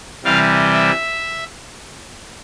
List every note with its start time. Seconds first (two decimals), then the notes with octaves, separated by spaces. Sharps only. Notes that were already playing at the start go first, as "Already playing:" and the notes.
0.24 C3 E3 G3 F5
0.73 E5